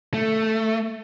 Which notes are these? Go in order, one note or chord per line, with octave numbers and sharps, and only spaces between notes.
A3